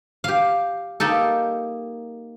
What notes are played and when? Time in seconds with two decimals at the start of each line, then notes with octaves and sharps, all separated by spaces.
0.24 G4 F5
1.00 A#3 D#4 G4 A4